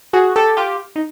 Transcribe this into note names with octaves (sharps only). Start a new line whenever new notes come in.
F#4 G#4
G4 A4
F4 G4
D#4